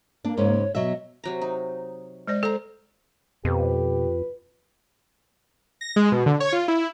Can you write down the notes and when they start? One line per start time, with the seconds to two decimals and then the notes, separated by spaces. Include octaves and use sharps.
0.25 A#3 D4
0.37 G#2 C#3 C#5
0.75 B2 F#3 D#5 E5
1.24 C3 F#3 A#5
1.41 D#4
2.28 G#3 C5 D5
2.43 A4 C5 A#5
3.45 F2 B2 G4 B4
5.81 A#6
5.96 G#3
6.12 B2
6.26 D3
6.40 C#5
6.53 F4
6.68 E4